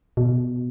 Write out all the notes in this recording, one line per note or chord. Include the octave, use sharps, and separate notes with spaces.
B2